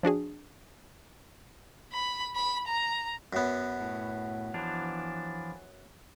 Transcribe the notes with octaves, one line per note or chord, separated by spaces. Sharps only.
F3 D4 F#4 G#4
B5
B5
A#5
F#2 B3
A2
E3 F3 D4